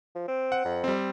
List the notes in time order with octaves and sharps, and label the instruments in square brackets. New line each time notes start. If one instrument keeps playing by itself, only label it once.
[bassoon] F3
C4
[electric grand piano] F#5
[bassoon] F2
[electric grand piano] G3 C4